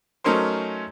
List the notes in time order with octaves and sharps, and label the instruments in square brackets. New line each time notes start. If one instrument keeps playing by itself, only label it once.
[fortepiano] F#3 A3 C#4 D#4 A#4 C5